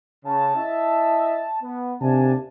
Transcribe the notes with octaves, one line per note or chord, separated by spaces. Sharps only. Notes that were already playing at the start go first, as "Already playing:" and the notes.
C#3 A5
E4 D#5 E5
B3
D#2 C3 D4 G#5 A5